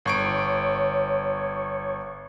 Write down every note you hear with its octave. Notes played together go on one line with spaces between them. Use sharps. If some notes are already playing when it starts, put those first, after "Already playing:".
G1 C#5 C#6 D7